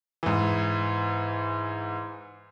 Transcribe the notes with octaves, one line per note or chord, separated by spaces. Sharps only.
G#2 E3